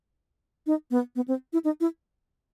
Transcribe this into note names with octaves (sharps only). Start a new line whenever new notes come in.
D#4
B3
B3
C4
E4
D#4
E4